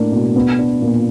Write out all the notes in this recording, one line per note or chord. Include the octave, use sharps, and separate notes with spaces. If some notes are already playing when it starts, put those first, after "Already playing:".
Already playing: A2 A#3 D4
B2
B3
D4
A#2